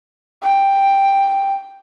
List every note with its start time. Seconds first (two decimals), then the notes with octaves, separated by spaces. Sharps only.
0.42 G5